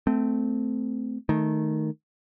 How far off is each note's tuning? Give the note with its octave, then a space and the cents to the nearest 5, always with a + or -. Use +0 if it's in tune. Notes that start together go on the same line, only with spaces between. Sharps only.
A3 +0 C4 -20
D#3 +0 A3 -5